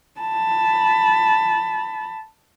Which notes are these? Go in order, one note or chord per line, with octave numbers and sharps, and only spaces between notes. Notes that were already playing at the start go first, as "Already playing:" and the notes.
A5 B5